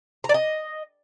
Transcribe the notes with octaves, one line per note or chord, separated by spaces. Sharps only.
A#5
D5
D#5